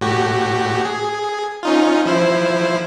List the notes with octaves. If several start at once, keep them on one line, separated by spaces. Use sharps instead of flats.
A2 F#4 G4
G#4
C#4 D#4 F4
F3 E4 C5